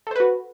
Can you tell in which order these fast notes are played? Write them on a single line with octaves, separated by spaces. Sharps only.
A4 C5 B4 F#4